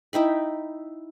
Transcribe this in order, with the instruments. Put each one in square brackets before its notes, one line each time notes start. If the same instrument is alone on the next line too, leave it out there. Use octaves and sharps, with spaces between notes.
[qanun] D#4 E4 G5 B5